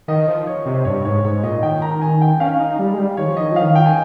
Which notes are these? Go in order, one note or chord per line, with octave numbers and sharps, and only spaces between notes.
D#3 D#5
F3
C#5
C3
G2 C#5
G#2 C#5
G#2 C#5
A#2 D#5
D#3 G5
A#5
G#5
G5
C#4 F5
D#4
G3
G#3
G3
D#3 C#5
F3
D#3 D#5
F3 F5
D#3
G5
G#5